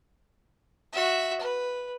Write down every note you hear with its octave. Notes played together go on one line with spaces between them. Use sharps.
F#4 E5
B4